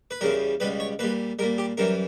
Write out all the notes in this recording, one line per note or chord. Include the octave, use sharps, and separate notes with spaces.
B4
E2 C#3 G3 A#4
C#2 B2 G3 B4
C#5
A#2 G3 B4
A#2 G3 A#4
G4
F#2 E3 G3 A#4